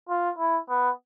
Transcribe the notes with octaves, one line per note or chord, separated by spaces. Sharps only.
F4
E4
B3